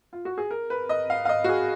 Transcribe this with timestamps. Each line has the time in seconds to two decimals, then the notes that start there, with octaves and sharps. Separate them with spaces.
0.13 F4
0.25 F#4
0.38 G#4
0.51 A#4
0.70 B4
0.89 D#5
1.10 F5
1.25 F5
1.29 D#5
1.44 F#4
1.49 G#4